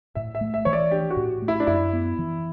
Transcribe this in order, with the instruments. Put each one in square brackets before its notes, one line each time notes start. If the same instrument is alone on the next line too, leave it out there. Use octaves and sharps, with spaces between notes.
[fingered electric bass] A2 [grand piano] E5
[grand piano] E5
[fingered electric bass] A3
[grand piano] E5
[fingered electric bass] E3 [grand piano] C#5
[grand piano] D5
[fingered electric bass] D4 [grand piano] G4
[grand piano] F#4
[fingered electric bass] A2
A3
[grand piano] E4
D4
[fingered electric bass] F#2 [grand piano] E4
[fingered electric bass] B3
E3